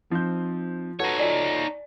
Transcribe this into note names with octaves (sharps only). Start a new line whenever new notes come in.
F3 C4 D#4 G6
D#4 F#4 A4 B4 C#5 D#5 A5
F4 A4 D5 D#5